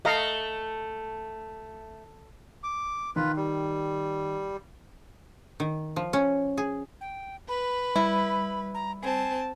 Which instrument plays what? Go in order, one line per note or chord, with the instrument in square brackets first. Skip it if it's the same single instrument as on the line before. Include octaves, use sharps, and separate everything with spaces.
[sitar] A3 [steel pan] D#5 F5 A#5
[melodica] D6
[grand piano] D#3 [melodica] F4 B4
[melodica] G3
[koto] D#3
F3
C#4
G#4
[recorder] G5
[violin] B4 [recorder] B5
[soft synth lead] G3 [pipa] E4
[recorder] A#5
[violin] C4 A5 [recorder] G#5